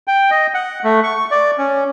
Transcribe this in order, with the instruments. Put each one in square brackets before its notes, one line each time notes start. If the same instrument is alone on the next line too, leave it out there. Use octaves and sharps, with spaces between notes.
[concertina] G5
D#5
F#5
A3
C#6
D5
C#4